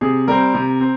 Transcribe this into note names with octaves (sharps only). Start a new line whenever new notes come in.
C3 G#4
G3 C4 A#4
C3
C4